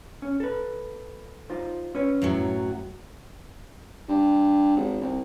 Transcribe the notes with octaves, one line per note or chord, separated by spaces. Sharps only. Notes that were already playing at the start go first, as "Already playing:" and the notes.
C#4
A4 B4
D#4 F4 C5
C#4 B4 C#5
F#2 A2 F#3
G2
G#1
C2